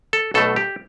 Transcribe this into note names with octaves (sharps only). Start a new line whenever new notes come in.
A4
B1 B2 A3 A4
G4